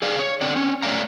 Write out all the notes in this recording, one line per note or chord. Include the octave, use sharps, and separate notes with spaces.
G#4 D5 F5
C#5
D3 C4 D5
C4 C#4
A3 C#5 D5 E5 F5 A#5